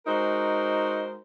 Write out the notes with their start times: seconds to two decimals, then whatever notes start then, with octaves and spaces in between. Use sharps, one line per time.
0.06 G#3 D#4 F#4 A#4 C5